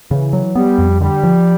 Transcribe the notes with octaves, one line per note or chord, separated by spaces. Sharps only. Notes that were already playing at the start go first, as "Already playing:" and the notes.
C#3 E3
F#3
G3 B3
F2
D3 G3
F3